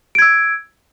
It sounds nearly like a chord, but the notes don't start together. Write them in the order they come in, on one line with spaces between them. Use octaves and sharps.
D7 G#6 E6